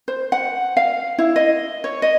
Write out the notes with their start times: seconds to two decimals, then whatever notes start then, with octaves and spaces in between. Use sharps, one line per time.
0.08 C5
0.32 F#5
0.77 F5
1.18 E4
1.36 D#5
1.84 C#5
2.02 D#5